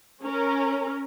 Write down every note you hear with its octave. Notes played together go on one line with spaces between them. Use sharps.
C#4 A#4